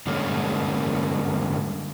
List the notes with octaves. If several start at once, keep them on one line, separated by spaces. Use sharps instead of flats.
G2 D3 G#3 A#3 C#4